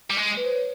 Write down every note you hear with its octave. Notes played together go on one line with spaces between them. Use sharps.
G3
G#3
B4
C5
C#5